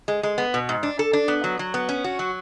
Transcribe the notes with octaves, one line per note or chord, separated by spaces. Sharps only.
G#3
G#3
B3
B2
G#2
D4
A4
D4
B3
F#3
F#3
B3
C#4
F#4
F#3